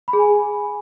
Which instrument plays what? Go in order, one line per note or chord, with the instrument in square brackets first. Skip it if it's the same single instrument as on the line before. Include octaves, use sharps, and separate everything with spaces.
[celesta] B5
G#4
G#5